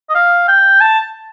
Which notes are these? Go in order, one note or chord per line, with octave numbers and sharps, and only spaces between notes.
D#5
F5
G5
A5